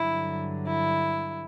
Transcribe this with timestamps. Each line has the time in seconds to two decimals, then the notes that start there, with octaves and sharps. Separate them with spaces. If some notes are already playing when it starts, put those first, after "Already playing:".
Already playing: G2 D3 F#3 E4
0.67 E4